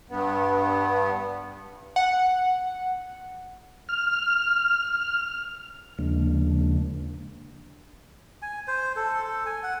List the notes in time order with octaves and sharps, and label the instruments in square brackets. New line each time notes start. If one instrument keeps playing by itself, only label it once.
[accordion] G2 B3
[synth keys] F#5
[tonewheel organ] F6
D#2 C#3 F3 G#3 A#3 D4
[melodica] G#5
C5
A4
G#5
F#5